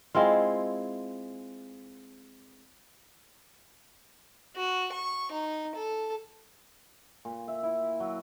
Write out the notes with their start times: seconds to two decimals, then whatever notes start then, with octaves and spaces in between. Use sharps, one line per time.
0.15 G#3 C4 E4 F4
4.56 F#4
4.92 C#6
5.31 D#4
5.75 A4
7.25 A#2
7.48 E5
7.63 E4
8.00 F#3